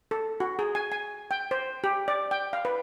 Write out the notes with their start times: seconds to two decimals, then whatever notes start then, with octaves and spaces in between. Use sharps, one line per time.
0.11 A4
0.40 F#4
0.59 G#4
0.75 G#5
0.92 G#5
1.31 G5
1.51 C5
1.84 G4
2.08 D5
2.31 G5
2.53 F5
2.65 B4